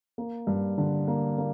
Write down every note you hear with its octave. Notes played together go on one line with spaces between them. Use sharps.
A#3
G2
D3
A#3
A#3